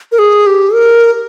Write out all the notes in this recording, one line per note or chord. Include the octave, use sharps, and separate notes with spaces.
A#4
G#4
G4
A#4